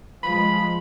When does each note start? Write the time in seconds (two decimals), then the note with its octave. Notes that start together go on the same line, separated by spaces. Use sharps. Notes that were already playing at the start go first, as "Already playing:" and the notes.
0.23 F3 G#3 B5